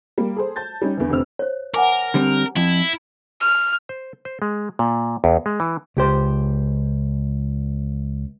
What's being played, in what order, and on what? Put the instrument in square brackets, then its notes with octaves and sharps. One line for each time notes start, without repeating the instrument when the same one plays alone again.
[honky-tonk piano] G3 A#3
G#4 A4 C5
A5 G6 A6
G3 C#4 D#4
E2 D3 E3
F1 F2 D3 C4 E6 F6
[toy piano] C5 C#5
[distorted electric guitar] A#4 [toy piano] F#5 G#5 D6
[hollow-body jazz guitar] D3 G3 C4
[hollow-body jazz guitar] F2 [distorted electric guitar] E4
[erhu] F6
[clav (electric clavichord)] C5
C5
G#3
A#2
E2
G#3
E3
[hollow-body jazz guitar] C#2 G4 C5